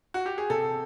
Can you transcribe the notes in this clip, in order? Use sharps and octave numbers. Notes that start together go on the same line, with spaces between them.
F#4
G4
G#4
C3 A4